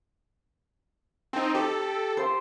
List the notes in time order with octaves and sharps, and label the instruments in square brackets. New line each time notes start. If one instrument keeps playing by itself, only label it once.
[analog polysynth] C4 D#4 [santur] A5
[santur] G4 [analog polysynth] A4
[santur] C5 C6